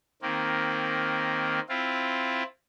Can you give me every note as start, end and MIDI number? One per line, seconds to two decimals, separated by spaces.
0.22 1.60 51
0.22 1.60 58
0.22 1.60 60
1.69 2.43 60
1.69 2.43 64
1.69 2.43 65